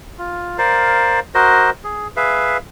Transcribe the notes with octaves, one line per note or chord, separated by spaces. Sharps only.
F4
A#4 C5 D5 F5
F#4 A#4 C5 D#5
G#4
G#4 B4 E5 F5